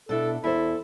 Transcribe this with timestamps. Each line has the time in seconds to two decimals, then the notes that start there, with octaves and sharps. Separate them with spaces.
0.09 B2 D4 E4 A4
0.44 E2 E4 A4 C5